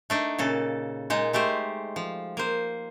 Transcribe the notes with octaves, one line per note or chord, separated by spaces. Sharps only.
A3 D4 D#4
A#2 C#3 A4
A#2 G#3 D#4
G#3 A3 G4 C5
F3
A#3 C5